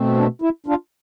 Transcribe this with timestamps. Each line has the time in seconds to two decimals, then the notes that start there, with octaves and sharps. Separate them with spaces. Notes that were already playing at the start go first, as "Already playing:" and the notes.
Already playing: B2 A3 C4
0.17 D4
0.42 E4
0.66 D4 F4